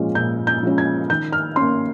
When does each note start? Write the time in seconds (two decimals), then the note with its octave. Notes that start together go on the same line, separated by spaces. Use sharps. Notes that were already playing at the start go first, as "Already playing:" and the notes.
Already playing: A#2 F3 G#3 C#4
0.15 A#2 G6
0.47 G6
0.63 F3 G#3 C#4
0.78 G#6
1.10 D#3 G6
1.33 F6
1.56 A#3 C#4 C6